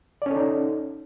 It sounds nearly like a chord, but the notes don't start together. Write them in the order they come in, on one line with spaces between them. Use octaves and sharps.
D5 C#4 A4 D#4